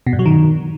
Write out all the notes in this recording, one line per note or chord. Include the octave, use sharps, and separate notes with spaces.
B2
G2
F#3
D#3